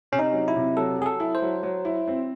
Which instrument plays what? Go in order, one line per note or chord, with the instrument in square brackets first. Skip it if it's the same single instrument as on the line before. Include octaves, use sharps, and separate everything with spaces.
[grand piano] C3 [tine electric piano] C#4
[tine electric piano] D#4
[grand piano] F#3
[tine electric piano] E4
[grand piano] C3
[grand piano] F#3 [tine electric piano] A4
[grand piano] F#3 [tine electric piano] G#4
[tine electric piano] A4
[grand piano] E4
[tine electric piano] C5
[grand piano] F#3
F#3
E4
C4